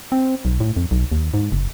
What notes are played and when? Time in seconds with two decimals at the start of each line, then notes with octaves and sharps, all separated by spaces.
0.12 C4
0.45 B1
0.60 A2
0.77 F2
0.91 B1
1.12 D#2
1.34 G#2
1.52 F#1